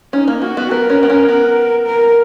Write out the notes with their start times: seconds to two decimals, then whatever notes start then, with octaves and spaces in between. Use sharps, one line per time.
0.13 C#4 D#4
0.28 A#3
0.42 A#3 F#4
0.57 B3
0.71 B3 A#4
0.90 C#4
1.03 B3
1.10 C#4
1.29 B3
1.86 A#4